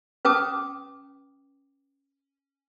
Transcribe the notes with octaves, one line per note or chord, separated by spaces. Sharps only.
C#4 B4 G5 A5 D6 D#6